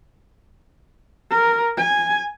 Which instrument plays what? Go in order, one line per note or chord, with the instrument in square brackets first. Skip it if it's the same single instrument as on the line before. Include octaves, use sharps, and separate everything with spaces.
[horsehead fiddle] A#4
G#5